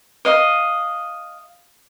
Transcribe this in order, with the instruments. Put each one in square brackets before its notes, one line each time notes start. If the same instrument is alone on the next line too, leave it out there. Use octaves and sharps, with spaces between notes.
[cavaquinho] D#5 F5